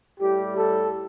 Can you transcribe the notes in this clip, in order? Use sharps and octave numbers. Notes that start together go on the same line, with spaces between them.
A2 G3 G4
A4